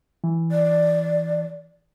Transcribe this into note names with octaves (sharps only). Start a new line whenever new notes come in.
E3
D5